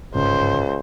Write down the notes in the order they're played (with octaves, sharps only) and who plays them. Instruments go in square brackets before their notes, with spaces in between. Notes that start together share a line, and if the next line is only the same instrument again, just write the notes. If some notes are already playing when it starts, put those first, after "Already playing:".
[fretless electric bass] G1 G#2 C#3 [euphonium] C#2 [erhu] C5